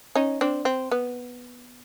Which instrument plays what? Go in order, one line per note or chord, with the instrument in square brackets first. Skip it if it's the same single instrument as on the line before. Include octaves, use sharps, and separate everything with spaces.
[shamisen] C#4 D#4
C4 D4
C4
B3